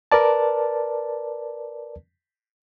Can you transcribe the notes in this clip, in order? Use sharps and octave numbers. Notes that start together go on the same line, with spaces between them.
A#4 B4 D5 A5